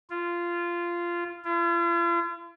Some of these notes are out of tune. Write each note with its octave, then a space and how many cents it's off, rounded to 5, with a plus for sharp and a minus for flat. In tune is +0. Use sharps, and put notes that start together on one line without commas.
F4 -15
F4 -45